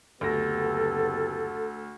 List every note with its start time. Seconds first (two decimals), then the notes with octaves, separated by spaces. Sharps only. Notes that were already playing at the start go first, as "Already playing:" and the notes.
0.21 F#1 D2 B3 G4 A4 A#6